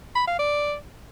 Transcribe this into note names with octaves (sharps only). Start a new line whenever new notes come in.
B5
F5
D5